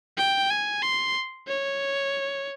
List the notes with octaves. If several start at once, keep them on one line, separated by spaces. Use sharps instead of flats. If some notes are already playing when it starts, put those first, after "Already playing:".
G5
G#5
C6
C#5